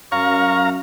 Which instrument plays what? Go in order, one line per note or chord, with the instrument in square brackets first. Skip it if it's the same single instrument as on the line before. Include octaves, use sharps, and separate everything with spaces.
[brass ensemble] F#2 [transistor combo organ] F5 A#5 [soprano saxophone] C#6